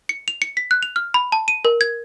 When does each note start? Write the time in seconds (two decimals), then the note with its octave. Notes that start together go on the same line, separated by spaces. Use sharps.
0.09 C#7
0.28 F7
0.42 C#7
0.57 B6
0.71 F#6
0.83 F7
0.96 F6
1.14 B5
1.32 A5
1.48 D#7
1.65 A#4
1.81 G#6